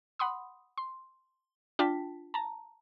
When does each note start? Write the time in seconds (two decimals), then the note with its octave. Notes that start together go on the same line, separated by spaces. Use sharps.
0.19 F#5 B5 C6 D#6
0.77 C6
1.79 D4 F4 G5 A5 B6
2.34 A5 A#5